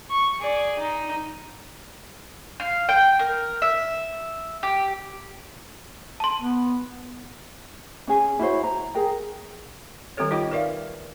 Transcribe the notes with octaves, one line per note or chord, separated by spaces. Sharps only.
C#6
G#4 D5
D#4
F5
G5
A#4
E5
G4
A5 C6
B3
C#4 G#4
E4 F#4 C5 C#5
A#5
G#4 A#4 G5
D#3 G3 C4 G4 A4 C#5
D#4 F4 G4 D#5 G5 D6
A#4 B4 D5 E5 F5